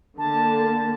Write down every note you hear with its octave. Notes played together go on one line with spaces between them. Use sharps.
D3 A#3 A5